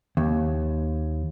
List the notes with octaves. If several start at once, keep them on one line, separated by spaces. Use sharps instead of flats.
D#2